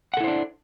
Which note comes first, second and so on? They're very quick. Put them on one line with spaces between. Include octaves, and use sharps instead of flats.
F#5 A4 E4 C5 D4